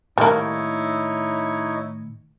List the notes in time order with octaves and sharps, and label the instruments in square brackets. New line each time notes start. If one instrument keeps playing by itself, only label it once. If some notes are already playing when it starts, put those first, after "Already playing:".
[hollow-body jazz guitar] A2 D#3 [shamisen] G3 A#3 [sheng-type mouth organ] D#4 E4 C#5